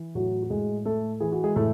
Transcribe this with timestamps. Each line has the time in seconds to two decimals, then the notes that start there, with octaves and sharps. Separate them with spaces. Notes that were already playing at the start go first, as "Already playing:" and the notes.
Already playing: E3
0.15 A2 F#3 F#4
0.42 F#4
0.50 A2 G#3 G#4
0.85 A3 A4
1.20 E3 G#4
1.32 F#4
1.44 G#3 G#4
1.56 A2 A3 A4